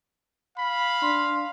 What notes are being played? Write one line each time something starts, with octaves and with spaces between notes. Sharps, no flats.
F5 B5
D4 C6